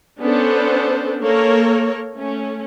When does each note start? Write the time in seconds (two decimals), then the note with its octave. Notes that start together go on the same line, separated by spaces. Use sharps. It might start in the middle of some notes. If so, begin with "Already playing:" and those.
0.21 B3 C#4 D4 A4 C5
1.22 A#3 A4 A#4 C#5
2.16 A3 C#4